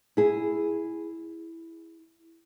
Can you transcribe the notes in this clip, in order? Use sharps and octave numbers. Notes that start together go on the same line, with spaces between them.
E4 G#4